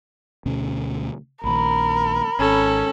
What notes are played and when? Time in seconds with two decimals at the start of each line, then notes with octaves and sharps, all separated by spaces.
0.46 D2 B2 C#4
1.44 A#1 A#2 D#3 A#4 B5
2.39 G#1 C#4 A4